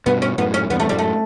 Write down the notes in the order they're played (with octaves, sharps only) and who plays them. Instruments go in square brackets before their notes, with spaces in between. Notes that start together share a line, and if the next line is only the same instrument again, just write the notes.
[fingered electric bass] G2 B2 [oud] B3
[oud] C#4
[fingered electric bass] F#2 A2 [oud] B3
[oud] C#4
[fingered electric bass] E2 G2 [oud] B3
[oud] A3
[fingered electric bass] F#2 A2 [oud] G3
[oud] A3